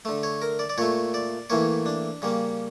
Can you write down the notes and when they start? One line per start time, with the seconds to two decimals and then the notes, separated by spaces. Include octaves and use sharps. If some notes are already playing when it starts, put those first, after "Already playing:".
0.05 D3 A3
0.23 C#5
0.42 A#4
0.59 D5
0.69 D5
0.78 A#2 A3 C#5
1.14 D5
1.50 A2 E3 A#3 C#5
1.86 D4
2.22 C#3 G3 A#3